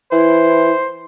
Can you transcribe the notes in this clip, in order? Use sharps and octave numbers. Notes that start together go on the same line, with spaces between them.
E3 E4 C5